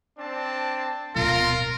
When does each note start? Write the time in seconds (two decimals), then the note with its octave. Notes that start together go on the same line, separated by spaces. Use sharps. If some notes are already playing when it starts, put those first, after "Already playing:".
0.18 C4 D4 A5
1.16 D1 B2 F4 A#4